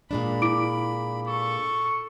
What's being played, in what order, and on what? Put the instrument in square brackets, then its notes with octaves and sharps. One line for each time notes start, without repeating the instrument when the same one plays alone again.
[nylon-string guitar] A#2 G#3 D4 [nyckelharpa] B5
[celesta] E4 D6 D7
[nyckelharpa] A4 [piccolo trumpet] C#6